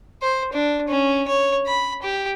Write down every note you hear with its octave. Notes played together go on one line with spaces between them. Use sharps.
C5
D4
C#4
C#5
B5
G4